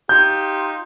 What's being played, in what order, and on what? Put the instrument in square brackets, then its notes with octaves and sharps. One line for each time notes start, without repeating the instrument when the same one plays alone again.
[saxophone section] D#4 F4 G4 [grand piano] G6